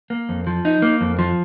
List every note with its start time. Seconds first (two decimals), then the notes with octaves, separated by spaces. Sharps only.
0.10 A#3
0.29 F2
0.47 F3
0.65 D#4
0.82 A#3
1.01 F2
1.19 F3